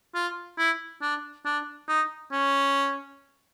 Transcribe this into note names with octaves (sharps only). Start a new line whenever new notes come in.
F4
E4
D4
D4
D#4
C#4